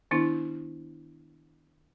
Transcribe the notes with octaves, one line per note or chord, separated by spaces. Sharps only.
D#3 B3 D4 E4